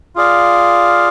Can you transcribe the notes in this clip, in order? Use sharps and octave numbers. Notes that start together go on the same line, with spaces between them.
F4 G#4 D5 F5